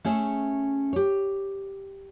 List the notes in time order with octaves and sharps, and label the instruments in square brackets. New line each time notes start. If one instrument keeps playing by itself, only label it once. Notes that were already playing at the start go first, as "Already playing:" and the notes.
[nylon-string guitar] A3 C#4 G#4 E5
G4 C#5